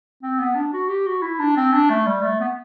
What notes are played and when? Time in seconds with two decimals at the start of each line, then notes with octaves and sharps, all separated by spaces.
0.23 C4
0.40 B3
0.55 D4
0.73 F#4
0.89 G4
1.06 F#4
1.22 E4
1.39 D4
1.57 C4
1.73 D4
1.90 A3
2.06 G3
2.22 A3
2.40 B3